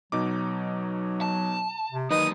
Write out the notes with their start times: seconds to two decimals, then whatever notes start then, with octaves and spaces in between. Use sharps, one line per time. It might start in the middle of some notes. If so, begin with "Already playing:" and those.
0.12 B2 F#3 D#4 D6
1.21 A5
1.92 C3
2.10 D#3 F#3 G#3 D#4 B4 D#5 D#6